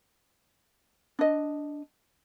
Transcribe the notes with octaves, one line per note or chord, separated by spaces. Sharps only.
D4 D#5